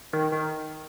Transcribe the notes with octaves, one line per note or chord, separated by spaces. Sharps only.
D#3
D#3